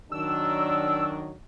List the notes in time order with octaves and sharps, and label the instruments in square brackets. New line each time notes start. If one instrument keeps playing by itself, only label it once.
[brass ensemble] D#3 F#3 D4 [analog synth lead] E6